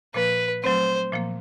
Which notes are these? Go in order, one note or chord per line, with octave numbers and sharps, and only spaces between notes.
A#2 F3 A#3 B4
F#3 A3 C4 C5
A#2 F3 A#3